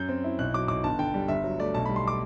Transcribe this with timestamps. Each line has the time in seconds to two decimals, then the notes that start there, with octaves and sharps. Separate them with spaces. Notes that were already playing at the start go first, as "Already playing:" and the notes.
Already playing: F#2 G6
0.09 C4
0.24 E4
0.39 B1 F#6
0.54 F#3 D6
0.68 B1 D6
0.84 G1 A5
0.98 D3 G5
1.14 G3
1.28 G1 E5
1.44 F#3
1.59 A3 D5
1.74 B1 A5
1.86 B5
1.89 G3
1.96 C6
2.08 D6